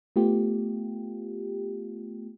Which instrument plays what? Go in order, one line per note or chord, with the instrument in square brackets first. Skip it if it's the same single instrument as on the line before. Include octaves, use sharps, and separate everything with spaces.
[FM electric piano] A3 B3 F4 G4